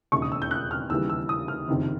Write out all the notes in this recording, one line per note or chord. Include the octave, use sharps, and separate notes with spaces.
E1 D#2 C#3 C#6
D#6
E6
G6
F#6
F6
D#2 C#3 E3 G3 E6
E6
D#6
F6
F#1 F2 C3 D#3